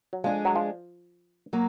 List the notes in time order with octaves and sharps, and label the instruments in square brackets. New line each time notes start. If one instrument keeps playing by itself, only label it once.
[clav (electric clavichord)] F#3
[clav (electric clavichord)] F3 [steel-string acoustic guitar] G#3 D4 G#4
[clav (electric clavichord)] F#3
F3
[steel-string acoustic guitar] F#3 A#3